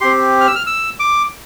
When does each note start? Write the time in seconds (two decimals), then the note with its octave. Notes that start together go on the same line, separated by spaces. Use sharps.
0.01 C4 G4 C6
0.41 F6
0.47 E6
0.55 F6
0.67 E6
1.00 D6